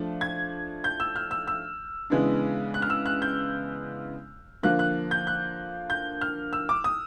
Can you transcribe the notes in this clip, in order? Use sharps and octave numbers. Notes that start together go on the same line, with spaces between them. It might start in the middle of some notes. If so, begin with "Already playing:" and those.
Already playing: F3 A3 D4
G#6
G6
E6
F6
E6
E6
C#3 E3 G#3 B3 D4
F#6
F6
E6
F#6
G6
D3 F3 A#3 F#6
F#6
G6
F#6
G6
F6
E6
D6
D#6